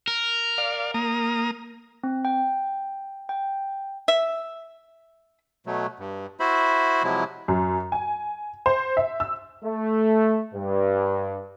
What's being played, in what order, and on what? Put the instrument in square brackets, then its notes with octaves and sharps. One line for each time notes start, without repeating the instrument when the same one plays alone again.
[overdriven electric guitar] A#4
[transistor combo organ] D5 F5
A#3 A#5 D#6
[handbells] C4
G5
G5
[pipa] E5
[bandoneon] B2 F#3 A3
G2
E4 F#4 C5 E5 B5
C3 F3 F#3 G#3 E4
[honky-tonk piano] F#2
G#5
C5
E5
E6
[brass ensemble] A3
G2